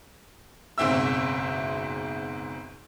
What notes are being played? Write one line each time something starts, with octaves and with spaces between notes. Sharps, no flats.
F#1 G#2 B2 C4 E5 E6